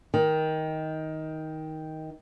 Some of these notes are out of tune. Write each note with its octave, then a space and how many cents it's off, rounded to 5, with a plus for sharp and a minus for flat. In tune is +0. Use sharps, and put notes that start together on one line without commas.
D#3 +15